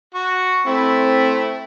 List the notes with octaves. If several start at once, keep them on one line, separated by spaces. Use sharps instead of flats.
F#4 C#6
A3 C4 E4